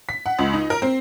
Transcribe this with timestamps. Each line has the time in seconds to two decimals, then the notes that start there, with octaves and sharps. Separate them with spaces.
0.09 B6
0.26 F#5
0.39 C#2
0.53 D#4
0.70 A#4
0.82 C4